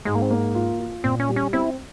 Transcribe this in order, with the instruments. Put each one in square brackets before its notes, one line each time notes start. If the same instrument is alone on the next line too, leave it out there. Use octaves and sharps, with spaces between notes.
[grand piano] G#2 [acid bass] G#3
[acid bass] A#3
C4
[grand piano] A#3
F4
F4
[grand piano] A#2 [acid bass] C4
[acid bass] C#4
[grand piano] G3
[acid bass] C#4
[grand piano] C4 [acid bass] E4